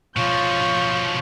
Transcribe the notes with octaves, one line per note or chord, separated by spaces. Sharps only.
B2 F3 F4 C#5 C#6 G6